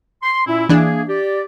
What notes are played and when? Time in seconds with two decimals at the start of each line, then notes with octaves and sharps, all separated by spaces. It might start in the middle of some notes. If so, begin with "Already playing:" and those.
0.23 C6
0.47 A#2 C#4 E4
0.69 E3 A#3 D4 G#4
1.08 G4 D5